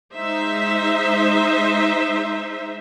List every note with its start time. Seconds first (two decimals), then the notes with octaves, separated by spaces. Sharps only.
0.15 G#3 D#4 C5 E5